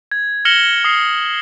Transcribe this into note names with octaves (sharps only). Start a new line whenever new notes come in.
G#6
F6 A#6 C#7 E7 F#7 G7
D#6 C7